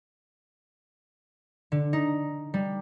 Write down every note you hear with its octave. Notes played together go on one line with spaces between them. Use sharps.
D3
D#4
G3